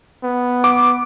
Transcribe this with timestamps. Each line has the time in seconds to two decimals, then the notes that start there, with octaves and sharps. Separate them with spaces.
0.24 B3
0.64 D6